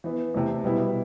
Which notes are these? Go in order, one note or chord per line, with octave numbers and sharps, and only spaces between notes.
E3 B3 E4
C3 E3 A3
B2 G3 B3 E4